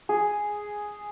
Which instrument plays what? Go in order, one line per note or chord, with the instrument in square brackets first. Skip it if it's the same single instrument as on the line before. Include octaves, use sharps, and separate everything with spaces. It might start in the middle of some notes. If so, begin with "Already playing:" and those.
[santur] G#4